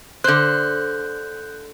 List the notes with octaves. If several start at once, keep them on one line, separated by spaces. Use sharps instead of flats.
D3 C5 F#6 G6